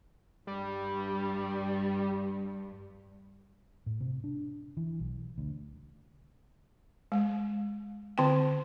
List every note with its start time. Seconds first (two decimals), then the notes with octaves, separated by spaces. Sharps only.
0.47 G2 G3
3.86 A2
4.00 C3
4.24 D4
4.77 E3
5.00 B1
5.38 D2
7.12 G#3
8.18 D3 C4 G5